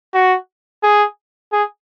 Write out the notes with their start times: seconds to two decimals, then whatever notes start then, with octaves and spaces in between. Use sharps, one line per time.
0.14 F#4
0.83 G#4
1.53 G#4